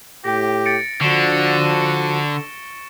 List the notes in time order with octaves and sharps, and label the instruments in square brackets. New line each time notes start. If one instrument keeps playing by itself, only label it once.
[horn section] A2 G4 [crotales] A#6
[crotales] A6 C#7 D7
[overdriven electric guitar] D3 [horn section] F3 D4 F#4 [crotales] C#6 E7 G7